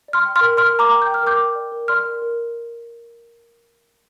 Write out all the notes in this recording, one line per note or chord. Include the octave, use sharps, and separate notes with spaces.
D5
C6 F6
G5
C6 F6
A#4
D5 C6 F6
A#4
A#5 D6
G5
G5 G6
F6
A#4 D6 G6
G5
D5
A#4
D5 C6 F6
A#4
A#4